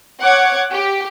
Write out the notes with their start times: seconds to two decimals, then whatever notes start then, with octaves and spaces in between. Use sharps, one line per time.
0.22 C#5 F#5 D6 G#6
0.72 G4